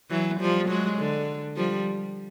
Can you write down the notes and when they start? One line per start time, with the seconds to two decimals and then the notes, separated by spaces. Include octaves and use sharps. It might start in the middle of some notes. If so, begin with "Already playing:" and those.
0.10 E3 F#3
0.40 F3 G3
0.69 F#3 G#3
0.98 D3
1.56 F3 G3